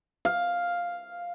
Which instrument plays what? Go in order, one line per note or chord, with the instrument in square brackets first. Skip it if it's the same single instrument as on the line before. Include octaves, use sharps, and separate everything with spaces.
[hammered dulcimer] F5